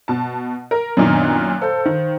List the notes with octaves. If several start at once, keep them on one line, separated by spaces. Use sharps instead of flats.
B2 A5
A#4
F#2 A#2 D#3 B3 D4 D#5
F#6
A4 C5 F5 G6
D#3